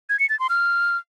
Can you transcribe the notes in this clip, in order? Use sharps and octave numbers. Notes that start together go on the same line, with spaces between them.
G#6
C#7
A6
C6
F6